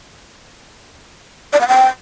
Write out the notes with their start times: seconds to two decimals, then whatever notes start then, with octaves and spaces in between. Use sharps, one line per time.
1.53 D5
1.61 F#5
1.68 G5